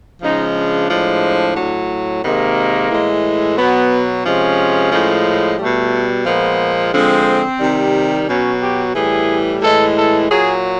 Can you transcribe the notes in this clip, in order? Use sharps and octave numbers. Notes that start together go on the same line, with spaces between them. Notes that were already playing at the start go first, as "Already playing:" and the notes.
C#3 F3 G#3 D#4
D4
A2 F3 G#3
A2 F#3
C3 D#3 G#3 A#3
A2 E3 G#3
B2 F#3 B3
C3 F3 G#3 C#4
A2 F3 G#3
B2 G3 A3
A#2 F3 G#3 B3
D3 F3 G#3 C4
C3 D#3 G3
B2 F#3 C#4
G4
A2 E3 G3 G#4
A2 E3 G#3 A4
A4
A#2 F#3 G#4